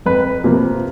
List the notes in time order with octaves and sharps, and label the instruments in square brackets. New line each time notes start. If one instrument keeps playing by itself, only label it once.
[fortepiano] F2 B4
C3 F3 A#3